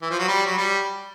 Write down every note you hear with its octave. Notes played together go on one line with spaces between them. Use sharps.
E3
F3
F#3
G3
F#3
G3